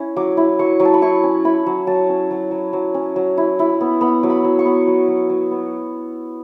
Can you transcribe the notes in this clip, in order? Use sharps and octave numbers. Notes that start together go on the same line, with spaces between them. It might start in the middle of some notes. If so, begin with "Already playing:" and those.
Already playing: C#4 E4
F#3 D6
E4
F#3 C#6
F#3
A5
B5
E4 C#6
C#4
E4 B5
F#3
F#3 A5
C#4
F#3
F#3
F#3
C#4
F#3
E4
E4
B3
B3 B5
F#3
B5
F#3
C#6
B3
F#3
F#3
F#3
B3